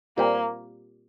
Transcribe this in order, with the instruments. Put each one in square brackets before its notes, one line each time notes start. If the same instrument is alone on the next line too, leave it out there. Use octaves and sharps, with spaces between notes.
[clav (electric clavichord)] A#2 G3 C4 G4 C5 [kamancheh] A#3